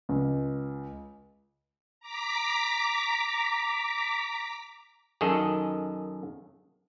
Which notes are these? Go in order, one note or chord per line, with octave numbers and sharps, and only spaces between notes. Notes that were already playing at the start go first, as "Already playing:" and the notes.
C#2
A#5 D6 B6
F#2 D#3 G#4 A4 D#5